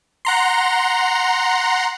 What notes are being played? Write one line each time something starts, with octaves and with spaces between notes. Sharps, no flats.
F#5 A#5 C6